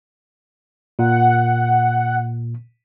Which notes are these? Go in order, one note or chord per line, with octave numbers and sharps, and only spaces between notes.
A#2 F#5